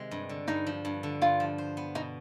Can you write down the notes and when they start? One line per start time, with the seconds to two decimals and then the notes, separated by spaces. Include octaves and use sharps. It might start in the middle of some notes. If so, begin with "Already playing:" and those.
Already playing: C3 D#3 G#3
0.11 G2
0.29 D3
0.48 G2 D#4
0.67 F3
0.85 G2
1.03 D3
1.22 G2 F4
1.40 F3
1.58 C5
1.77 B3
1.95 B2 D#4